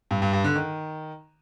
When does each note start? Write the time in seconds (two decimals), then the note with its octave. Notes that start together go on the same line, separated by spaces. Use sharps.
0.11 G2
0.22 G2
0.33 G2
0.44 D3
0.56 D#3